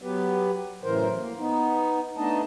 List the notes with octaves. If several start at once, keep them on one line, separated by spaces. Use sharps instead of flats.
F#3 B3 G4 B4
F#2 A2 C#3 E3 A#4 C5
A#3
B3 D#4
A3 B3 D4 D#4 D#5 A5